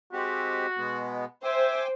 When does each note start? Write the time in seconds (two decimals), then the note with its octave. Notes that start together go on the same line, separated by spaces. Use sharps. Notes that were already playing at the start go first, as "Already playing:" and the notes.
0.13 G#3 C4 F#4 G4
0.78 B2 G#3 B3
1.44 C5 E5 G5 G#5 D6